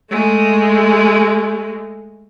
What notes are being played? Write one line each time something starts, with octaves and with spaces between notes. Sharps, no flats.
G#3 A3